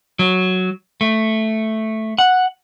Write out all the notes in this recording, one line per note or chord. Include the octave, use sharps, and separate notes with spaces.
F#3
A3
F#5